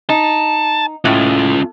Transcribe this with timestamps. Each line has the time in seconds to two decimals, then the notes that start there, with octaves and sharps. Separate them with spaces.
0.09 D#4 A5
1.05 A2 C#4 F4